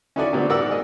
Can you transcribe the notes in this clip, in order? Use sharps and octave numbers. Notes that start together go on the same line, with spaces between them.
C#4 D#4 E4 F#4 A4 D5
A#2 D3 G3 B3 C4 D4
G#2 B3 A#4 D5 F#5 E6
G#4 D#5